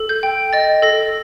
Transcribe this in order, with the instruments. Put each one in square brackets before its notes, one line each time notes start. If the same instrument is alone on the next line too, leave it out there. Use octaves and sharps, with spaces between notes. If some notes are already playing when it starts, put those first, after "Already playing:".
Already playing: [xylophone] A4
G6
G5
D#5 A6
A4 A#6